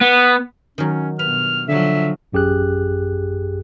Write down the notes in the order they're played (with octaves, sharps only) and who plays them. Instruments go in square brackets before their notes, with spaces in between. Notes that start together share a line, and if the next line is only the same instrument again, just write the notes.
[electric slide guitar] B3
[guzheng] D#3 F#3 [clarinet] C#4
[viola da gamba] G2 B2 [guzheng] B4 [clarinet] F6
[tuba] D3 [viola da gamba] F3 F#3 [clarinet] E5
[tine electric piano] A1 F#2 G4 G#4 F#6